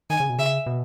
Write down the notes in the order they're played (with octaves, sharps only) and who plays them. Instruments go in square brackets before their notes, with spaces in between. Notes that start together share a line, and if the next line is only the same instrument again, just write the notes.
[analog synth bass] D#3 [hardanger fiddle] G#5
[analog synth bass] C#3
B2
[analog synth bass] C#3 [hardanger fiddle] E5
[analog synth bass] B2